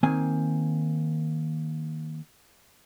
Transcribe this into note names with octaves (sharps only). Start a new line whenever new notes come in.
D#3 A#3 C4 G#5